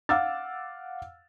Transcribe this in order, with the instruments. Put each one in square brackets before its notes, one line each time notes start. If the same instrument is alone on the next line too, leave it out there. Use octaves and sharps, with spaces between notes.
[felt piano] F5 F#5 D6 E6 F6 A6